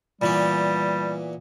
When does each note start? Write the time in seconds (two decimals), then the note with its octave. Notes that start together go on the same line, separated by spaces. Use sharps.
0.22 A#2 E3 G3 B3